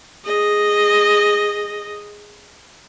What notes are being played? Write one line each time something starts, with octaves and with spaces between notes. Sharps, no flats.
G#4 D#5